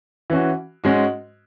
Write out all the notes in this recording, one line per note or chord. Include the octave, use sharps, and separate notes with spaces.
E3 C#4 F#4
G#2 G#3 C#4 F#4